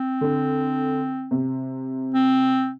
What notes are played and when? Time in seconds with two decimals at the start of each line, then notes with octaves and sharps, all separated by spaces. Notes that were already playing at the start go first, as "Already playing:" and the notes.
Already playing: C4
0.21 D3
1.31 C3
2.15 C4